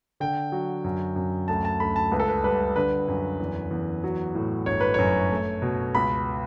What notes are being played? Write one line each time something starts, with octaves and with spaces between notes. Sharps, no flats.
D3 G5
F#3
F#2
F#2
D2 A5
A5
D2 B5
A5
C#2 B4
A4
B4
G3 B4
D3 B4
F#2
E2
E2
F#3
A2
G1 C#5
B4
F#2 C#5
A3
B2
C#2 B5